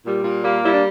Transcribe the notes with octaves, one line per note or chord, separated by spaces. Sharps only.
A#2 G3
A#2
G3 A#3
G3 E4
D4